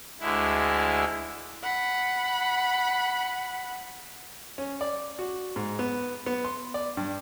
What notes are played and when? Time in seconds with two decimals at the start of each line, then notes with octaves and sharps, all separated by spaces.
0.20 D2 D3 G#3 E4
1.63 F#5 B5
4.58 C#4
4.81 D5
5.19 F#4
5.56 G#2
5.79 B3
6.26 B3
6.44 C6
6.74 D5
6.97 G2